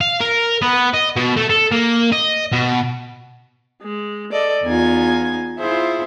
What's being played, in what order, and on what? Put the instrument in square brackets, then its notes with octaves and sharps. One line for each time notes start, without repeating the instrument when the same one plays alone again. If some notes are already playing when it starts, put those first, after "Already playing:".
[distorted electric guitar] F5
A#4
B3
D#5
B2
A3
A4
A#3
D#5
B2
[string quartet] G#3
A4 D5 D#5
E2 B3 D#4 F4 G#5 G#6
E4 F4 G#4 C5 E5